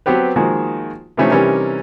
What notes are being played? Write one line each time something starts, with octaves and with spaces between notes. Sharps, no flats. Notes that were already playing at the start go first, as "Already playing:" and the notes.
F#3 B3 C4 G4 B4
D#3 F3 G#3 A#3 F#4
C3 E3 F3 A3 C#4 D#4
C3 E3 G3 C#4 D#4 A#4